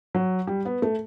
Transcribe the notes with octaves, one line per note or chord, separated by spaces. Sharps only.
F#3
G3
B3
A3